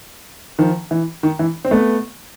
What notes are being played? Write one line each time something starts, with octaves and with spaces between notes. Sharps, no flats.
D#3 F3
E3
D#3
E3
C4
A3 B3